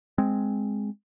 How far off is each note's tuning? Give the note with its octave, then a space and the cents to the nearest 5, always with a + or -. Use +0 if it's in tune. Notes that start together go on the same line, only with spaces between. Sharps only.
G#3 +0 C4 +0